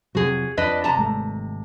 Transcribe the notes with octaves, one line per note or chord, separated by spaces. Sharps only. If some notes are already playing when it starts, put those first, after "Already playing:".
F2 C3 F#3 F#4 G#4
F2 D4 B4 D#5
C3 A5 A#5
G#1 G#3 A3